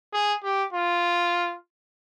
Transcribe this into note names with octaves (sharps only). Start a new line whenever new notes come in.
G#4
G4
F4